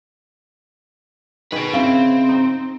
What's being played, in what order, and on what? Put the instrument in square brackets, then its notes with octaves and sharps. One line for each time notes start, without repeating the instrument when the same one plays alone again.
[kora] D#3 G#4 [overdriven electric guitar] B4 D#5
[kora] C#3 E4 [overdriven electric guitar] C4
[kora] D#4